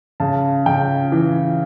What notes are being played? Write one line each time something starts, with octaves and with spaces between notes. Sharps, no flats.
C#3 A5
C#3 G5
E3